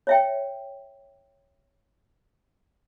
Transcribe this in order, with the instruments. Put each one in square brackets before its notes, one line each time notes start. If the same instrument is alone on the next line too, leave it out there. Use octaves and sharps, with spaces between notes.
[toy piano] C#5 E5 G5